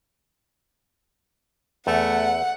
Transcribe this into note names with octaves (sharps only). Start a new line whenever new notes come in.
E2 A3 F#5